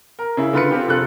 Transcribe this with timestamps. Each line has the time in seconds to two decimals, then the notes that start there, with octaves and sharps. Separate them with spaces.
0.19 A#4
0.37 C#3 E4
0.53 D3 F4 B4 C#7
0.71 C4 F4 G4
0.88 F1 F4 A4 F#6